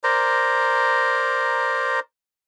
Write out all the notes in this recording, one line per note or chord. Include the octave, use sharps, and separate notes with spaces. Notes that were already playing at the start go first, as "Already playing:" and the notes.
A#4 C5 D5 A#5